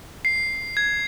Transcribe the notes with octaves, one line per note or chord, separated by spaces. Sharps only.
C7
G#6